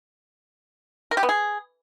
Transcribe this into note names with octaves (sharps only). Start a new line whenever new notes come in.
A#4
G4
B3
G#4